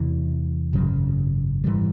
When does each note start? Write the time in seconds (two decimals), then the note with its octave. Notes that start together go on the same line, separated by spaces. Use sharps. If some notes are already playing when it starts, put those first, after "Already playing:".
Already playing: E2 C3 E3
0.73 G#1 F#2 C#3 F#3
1.64 G#2 E3 G3